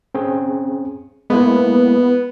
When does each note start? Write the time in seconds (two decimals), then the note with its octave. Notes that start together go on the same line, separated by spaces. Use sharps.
0.15 C4 C#4 G#4
1.30 G#3 A#3 B3 E4